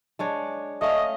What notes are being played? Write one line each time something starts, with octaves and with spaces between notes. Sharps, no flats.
G#3 D4 C#5
A3 C#4 D#5 F5